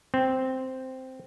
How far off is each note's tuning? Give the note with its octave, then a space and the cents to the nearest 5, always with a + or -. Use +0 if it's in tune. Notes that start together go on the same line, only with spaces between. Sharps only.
C4 -5